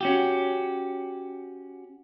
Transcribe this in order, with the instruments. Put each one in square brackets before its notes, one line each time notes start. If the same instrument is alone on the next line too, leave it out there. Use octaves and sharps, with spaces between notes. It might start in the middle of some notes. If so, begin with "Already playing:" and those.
[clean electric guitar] C#4 F#4 G4